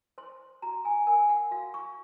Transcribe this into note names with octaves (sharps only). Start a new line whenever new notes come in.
C5 C6
F#4 A#5
G#5
A#4 G#5
F#5
F#4 F5
C#6